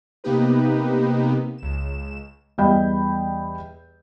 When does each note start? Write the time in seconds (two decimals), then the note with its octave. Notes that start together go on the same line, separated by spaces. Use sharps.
0.24 C3 A#3 B3 D#4 G4 B4
1.58 C#2 E7
2.58 E2 G3 D#5 G5 B5 G6